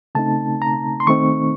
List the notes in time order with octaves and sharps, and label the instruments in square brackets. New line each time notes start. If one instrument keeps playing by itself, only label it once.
[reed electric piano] C#3 A3 C4 D#4 A5
A#5
C6
D#3 A3 C4 D#4 C#6